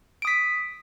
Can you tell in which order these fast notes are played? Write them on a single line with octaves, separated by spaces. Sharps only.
D7 D#6 B6